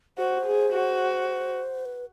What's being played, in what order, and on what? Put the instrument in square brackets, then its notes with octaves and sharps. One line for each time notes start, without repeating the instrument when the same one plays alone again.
[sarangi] F#4 [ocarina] C5
[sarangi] G#4
F#4
[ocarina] B4